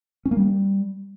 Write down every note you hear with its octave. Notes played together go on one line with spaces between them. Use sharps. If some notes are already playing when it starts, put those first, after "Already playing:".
C#4
A#3
G3